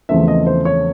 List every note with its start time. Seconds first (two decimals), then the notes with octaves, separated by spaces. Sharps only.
0.09 E2 C#3 F3 A3 C4 E5
0.28 D#5
0.47 C5
0.65 C#5